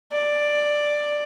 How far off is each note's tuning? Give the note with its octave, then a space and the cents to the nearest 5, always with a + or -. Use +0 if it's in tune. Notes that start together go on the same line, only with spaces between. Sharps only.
D5 +5